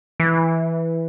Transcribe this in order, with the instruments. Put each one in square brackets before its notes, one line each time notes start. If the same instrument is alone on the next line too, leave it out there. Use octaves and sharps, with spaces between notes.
[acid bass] E3